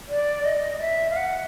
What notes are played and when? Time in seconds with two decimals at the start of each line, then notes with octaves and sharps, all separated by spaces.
0.08 D5
0.44 D#5
0.80 E5
1.10 F5
1.16 F#5